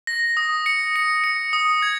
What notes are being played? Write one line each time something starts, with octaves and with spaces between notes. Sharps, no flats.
A#6
D#6
C#7
C#7
C#7
D#6
G#6